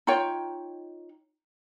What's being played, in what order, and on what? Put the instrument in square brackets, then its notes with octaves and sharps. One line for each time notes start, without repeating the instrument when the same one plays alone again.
[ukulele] D#4 F4 C#5 G5